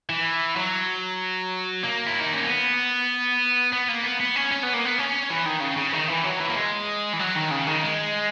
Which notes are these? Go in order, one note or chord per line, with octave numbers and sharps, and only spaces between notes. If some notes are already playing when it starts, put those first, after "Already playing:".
E3
F#3
A#3
E4
D#4
C#4
B3
B3
A#3
B3
B3
C#4
C#4
B3
A#3
B3
C#4
E3
D#3
C#3
C#3
D#3
E3
F#3
E3
A#3
G#3
E3
F#3
D#3
C#3
D#3
G#3